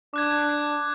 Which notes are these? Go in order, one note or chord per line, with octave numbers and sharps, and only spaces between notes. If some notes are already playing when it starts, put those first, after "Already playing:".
D4 D6 F#6 G#6